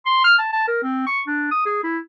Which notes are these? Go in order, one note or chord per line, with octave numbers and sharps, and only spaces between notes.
C6
F6
A5
A5
A#4
C4
C#6
D4
D#6
G#4
E4